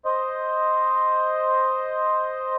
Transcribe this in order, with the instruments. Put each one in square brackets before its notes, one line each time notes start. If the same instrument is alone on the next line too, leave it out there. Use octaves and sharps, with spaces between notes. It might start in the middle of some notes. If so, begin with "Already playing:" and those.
[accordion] C5 D#5